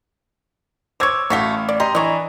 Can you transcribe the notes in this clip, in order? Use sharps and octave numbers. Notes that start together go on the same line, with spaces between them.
C5 C#5 D6 E6 G#6
A1 A3 F#4 C#5 F5 B6
D5
G4 D#5 A#5 C6
E3 D4 C#5 D#5 A#5